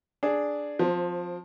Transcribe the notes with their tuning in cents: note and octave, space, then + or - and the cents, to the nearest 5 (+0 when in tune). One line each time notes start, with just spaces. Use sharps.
D4 +0 G#4 +5
F3 +20 C4 +0